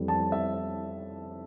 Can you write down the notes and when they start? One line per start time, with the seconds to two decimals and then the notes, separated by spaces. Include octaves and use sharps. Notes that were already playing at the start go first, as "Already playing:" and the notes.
Already playing: F2 E3 G3
0.08 A5
0.32 E5